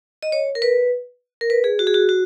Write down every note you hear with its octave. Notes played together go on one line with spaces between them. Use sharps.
D#5
C#5
A#4
B4
A#4
B4
G#4
F#4
G#4
F#4
F#4